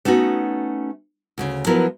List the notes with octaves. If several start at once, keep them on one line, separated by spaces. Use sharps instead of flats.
A3 B3 C#4 D#4 F#4
D2 A2 C#3
F3 F#3 B3 E4 A#4 B4